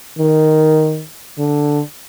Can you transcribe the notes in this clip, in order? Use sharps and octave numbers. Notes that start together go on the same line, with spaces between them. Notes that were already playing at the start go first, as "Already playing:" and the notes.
D#3
D3